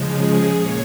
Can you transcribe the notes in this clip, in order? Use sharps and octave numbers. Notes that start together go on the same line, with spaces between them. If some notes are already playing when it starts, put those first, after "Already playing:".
Already playing: C#3 F3 G#3
G#4
A#2 C#5